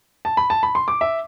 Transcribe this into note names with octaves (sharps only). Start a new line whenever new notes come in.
A5
B5
A5
B5
C6
D6
E5